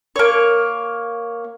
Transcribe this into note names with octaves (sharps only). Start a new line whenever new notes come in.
A#3 C#5